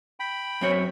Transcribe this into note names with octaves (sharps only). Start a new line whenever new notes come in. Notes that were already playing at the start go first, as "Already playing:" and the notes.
G5 B5
F#2 C4 C#5